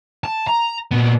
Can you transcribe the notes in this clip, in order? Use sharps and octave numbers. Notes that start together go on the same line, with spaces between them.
A5
A#5
A#2 B3